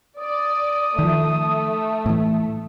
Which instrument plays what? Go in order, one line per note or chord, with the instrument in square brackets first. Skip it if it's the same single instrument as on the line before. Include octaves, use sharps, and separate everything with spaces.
[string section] D5 [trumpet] D#6
[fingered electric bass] D#3 F3 [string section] A3
[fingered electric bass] A2 E3